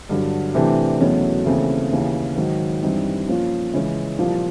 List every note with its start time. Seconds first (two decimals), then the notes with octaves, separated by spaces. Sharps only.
0.09 G2 D3 F#3
0.54 C3 E3 A3 D4 G4
1.00 E2 B2 F#3 A3 C#4
1.46 D#2 C#3 E3 A3 C4
1.91 D#2 C#3 E3
2.36 G#2 D#3 F#3
2.82 G2 E3 G3 C4 D#4
3.27 A#2 F3 A#3 C#4 F4
3.73 C#3 E3 G#3 C#4
4.19 C2 A#2 F3 A#3